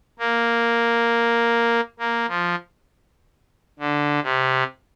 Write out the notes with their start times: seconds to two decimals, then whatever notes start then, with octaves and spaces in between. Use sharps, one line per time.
0.19 A#3
1.99 A#3
2.28 F3
3.79 D3
4.23 C3